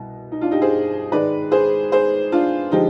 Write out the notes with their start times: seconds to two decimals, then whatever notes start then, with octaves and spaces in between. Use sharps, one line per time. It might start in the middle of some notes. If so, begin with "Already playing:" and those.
Already playing: C2 B2
0.32 D#4
0.41 D4 F4
0.51 D#4 G4
0.62 G#4 C5
1.12 G#2 D#3 G#3 B4 D5
1.52 G#4 C5
1.92 G#4 C5
2.32 D4 F4
2.72 D3 F3 G#3 D#4 G4